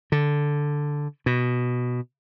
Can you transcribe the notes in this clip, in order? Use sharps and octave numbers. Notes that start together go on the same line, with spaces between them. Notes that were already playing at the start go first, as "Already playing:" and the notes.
D3
B2